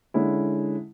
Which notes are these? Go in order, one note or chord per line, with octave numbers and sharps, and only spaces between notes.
D3 G#3 C#4 E4